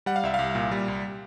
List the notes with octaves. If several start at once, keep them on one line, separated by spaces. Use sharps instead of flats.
G3 F#5
F5
C2 E5
C2 F5
A#2
G3
C2